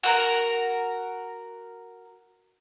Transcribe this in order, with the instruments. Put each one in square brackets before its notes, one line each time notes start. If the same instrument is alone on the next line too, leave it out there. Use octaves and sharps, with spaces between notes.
[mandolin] F#4 A#4 A#5